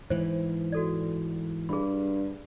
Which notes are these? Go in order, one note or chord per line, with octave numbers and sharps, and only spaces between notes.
G#2 E3 C5
F#4 A4 D5
G2 G#4 B5